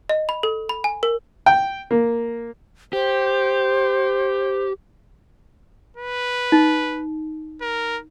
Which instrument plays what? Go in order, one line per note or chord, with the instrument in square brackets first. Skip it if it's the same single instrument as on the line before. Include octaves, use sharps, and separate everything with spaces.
[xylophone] D#5
B5
A4
B5
G#5
A#4
[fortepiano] G5
A#3
[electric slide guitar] G4 [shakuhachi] C5
[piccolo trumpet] B4
[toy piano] D#4
[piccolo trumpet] A#4